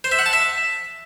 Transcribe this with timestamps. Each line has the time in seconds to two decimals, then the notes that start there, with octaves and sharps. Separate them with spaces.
0.04 C5
0.12 E5
0.19 F#5
0.26 A5
0.33 E5